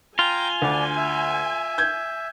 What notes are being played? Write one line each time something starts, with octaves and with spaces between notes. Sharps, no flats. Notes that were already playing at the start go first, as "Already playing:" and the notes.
F4 G5 G#5 A#5
D2 D4
E5
G6 G#6